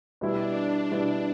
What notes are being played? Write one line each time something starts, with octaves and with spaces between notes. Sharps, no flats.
B2 G3 B3 D4 E4
B2 G3 B3 D4 E4